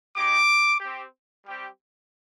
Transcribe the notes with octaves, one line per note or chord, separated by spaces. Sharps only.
G#3 D#4 G4 D6
C4 G4
G3 C4 G4